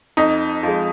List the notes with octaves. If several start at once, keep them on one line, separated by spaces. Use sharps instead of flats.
F2 D#4
F3 G#3